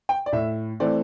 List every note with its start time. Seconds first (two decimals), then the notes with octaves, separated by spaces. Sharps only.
0.09 G5
0.26 D5
0.32 A2 E5
0.80 E3 A3 C4 D5